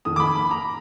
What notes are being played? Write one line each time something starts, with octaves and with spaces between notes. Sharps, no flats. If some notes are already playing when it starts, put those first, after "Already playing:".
F2 D#3 D#6
D6
B5
B5
A#5